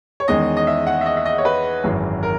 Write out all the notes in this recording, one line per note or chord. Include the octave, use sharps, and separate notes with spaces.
C#5
E2 D#3 G#3 C#4 D#5
D#5
E5
F#5
E5
D#5
E5
D#5
C#5
B4
G#1 F#2 E3 G#3
A#4